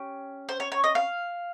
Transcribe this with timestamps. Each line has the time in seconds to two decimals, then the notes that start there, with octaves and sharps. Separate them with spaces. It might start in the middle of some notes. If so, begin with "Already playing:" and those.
Already playing: C#4 G4
0.49 C5
0.60 C#5
0.72 C#5
0.84 D#5
0.95 F5